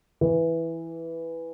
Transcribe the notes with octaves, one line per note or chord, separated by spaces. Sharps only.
E3